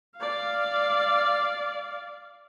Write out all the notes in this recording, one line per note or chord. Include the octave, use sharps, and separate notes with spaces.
D5 F5